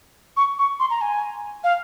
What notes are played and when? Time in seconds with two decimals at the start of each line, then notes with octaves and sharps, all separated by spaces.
0.37 C#6
0.59 C#6
0.80 C6
0.90 A#5
1.01 G#5
1.64 F5